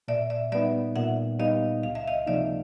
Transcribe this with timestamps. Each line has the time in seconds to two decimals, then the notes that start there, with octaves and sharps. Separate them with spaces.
0.08 A#2 D5 E5
0.30 D5 E5
0.52 G3 B3 D#4 D5 E5
0.96 A#2 E5 F#5
1.39 G3 B3 D#4 D#5 F5
1.83 C#2 F5
1.95 E5
2.07 D#5 F5
2.27 C3 F3 A#3 D#4 D5 E5